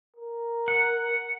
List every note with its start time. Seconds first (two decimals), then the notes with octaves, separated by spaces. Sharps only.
0.16 A#4
0.68 F#5